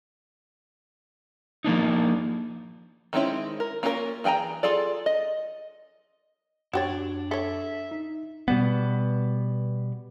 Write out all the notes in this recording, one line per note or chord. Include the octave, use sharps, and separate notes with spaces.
F3 A#3 D4 D#4
D#3 G#3 C4 C#4 E4
A#4
A#3 C#4 F4 A4 A#4
E3 G#4 G5 G#5 A#5
F4 G#4 A4 D5
D#5
F#2 D4 F#4 G4 C#5 A6
A4 C#5 E5
D#4
B2 G3 B3